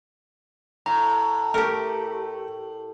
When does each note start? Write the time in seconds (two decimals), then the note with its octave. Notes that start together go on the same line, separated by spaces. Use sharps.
0.86 A2 A#5
1.54 A3 G4 A#4